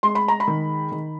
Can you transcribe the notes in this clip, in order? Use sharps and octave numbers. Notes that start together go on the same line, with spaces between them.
G#3 C6
B5
A#5
B5
D#3
D#3